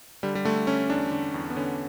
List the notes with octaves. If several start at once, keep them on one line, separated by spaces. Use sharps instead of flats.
D3 G3
G3
D3 A3
D3 C#4
E2 D4
D3
E2
B3
D3 C#4